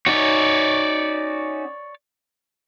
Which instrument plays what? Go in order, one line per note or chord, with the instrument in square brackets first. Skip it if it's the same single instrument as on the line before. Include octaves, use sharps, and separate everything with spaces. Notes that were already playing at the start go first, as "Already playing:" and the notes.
[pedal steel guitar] C#4 D#4 F#4 [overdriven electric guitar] C#5 D5